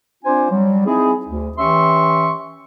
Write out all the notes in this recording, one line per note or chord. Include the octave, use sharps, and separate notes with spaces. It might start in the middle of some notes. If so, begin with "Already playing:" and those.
C4 D4 F4 C5 G#5
F#3 G3
C4 D#4 E4 G#4
D2
E3 C#4 G4 E5 C6 C#6